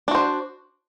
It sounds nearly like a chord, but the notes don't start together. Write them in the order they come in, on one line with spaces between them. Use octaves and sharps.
D4 F#4 C5